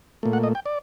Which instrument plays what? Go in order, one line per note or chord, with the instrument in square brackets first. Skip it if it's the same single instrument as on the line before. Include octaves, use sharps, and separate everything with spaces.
[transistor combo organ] A#2 A3
F#5
D#5
G5
D5